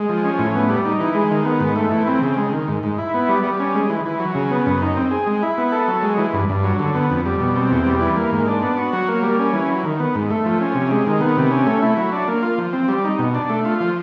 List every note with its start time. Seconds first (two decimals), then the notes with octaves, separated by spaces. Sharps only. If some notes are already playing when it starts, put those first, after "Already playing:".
Already playing: G#3
0.09 F3
0.24 C#4
0.39 A2
0.55 B3
0.69 G3
0.85 D#4
1.00 E3
1.15 G#3
1.31 D#3
1.45 B3
1.60 G#2
1.76 A3
1.91 E3
2.07 C4
2.22 C#3
2.37 G#3
2.53 D#3
2.68 G#2
2.83 G#2
2.98 E4
3.14 B3
3.29 G3
3.44 G3
3.60 C#4
3.75 G#3
3.90 E3
4.05 E3
4.19 F#3
4.35 C#3
4.51 B3
4.66 F#2
4.82 D#4
4.96 C4
5.11 G#4
5.27 G#3
5.43 E4
5.58 B3
5.72 A4
5.88 F#3
6.02 G#3
6.18 E3
6.33 G2
6.49 G2
6.64 F#3
6.79 D3
6.95 B3
7.10 F2
7.25 G3
7.40 B2
7.56 C4
7.71 E2
7.86 G3
8.01 E3
8.16 A#3
8.32 G#2
8.47 D4
8.63 B3
8.78 F#4
8.93 F#3
9.08 A#3
9.23 G3
9.39 C#4
9.53 E3
9.69 F#3
9.84 D#3
10.00 B3
10.15 G#2
10.30 A3
10.45 F3
10.61 C#4
10.75 C3
10.91 G#3
11.07 D#3
11.21 B3
11.37 C3
11.51 C#4
11.66 A3
11.82 E4
11.97 F#3
12.12 D4
12.28 A#3
12.43 F4
12.58 F3
12.73 C4
12.88 G3
13.05 D#4
13.19 B2
13.35 D4
13.50 A3
13.65 F4
13.80 F3